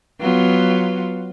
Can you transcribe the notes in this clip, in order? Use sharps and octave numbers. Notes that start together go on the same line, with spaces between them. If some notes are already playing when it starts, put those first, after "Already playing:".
F#3 B3 F4